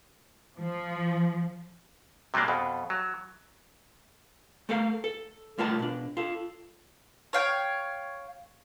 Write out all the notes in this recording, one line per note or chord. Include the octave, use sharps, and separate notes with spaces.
F3
C3 F#3 G3 A#3 D4
F2 B2
F#3
A3 A4 A#4 F5
A4
C2 A3 F4 A#4 A5
B2 D4
F4 A4
C#5 F5 G5